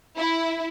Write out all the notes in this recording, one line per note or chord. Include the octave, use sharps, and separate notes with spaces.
E4